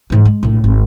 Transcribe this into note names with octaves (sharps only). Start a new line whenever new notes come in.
G#2 E3
G#3
A#1 A2
G#1